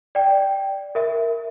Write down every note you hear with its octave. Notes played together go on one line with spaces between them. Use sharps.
D5 G5
A#4 E5